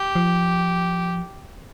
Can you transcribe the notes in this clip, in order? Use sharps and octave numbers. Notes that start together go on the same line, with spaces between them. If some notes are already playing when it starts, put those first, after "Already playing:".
Already playing: G4
F3